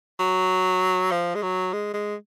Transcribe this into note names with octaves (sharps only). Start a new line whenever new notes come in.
F#3
F3
G#3
F#3
G#3
G#3